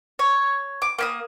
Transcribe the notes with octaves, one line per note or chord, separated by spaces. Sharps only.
C#5
D6
A#3 B5 D#6